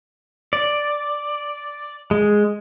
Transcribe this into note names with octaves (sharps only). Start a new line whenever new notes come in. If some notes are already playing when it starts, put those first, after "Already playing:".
D5
G#3